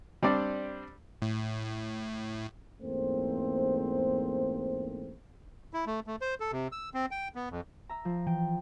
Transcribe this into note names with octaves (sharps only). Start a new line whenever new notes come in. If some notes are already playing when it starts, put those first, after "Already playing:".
G3 C4 D4 D5
A2
E2 G#2 A3 A#3 C4 C5
E4
A3
A3
C5
A4
C3
E6
C4
G5
B3
F2
E5 A#5
F3
E3 G5